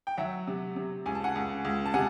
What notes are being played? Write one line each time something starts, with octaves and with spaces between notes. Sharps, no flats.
G5
F#3 E5 F#5
C3
C3
C#2 G#5
A5
F#5 G#5
C#2
C#2
A5
C3 F#5 G#5